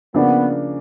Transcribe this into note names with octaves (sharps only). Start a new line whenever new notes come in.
C#3 F3 A#3 B3 D4